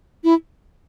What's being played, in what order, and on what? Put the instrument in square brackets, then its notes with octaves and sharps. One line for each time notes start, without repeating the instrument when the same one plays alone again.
[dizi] E4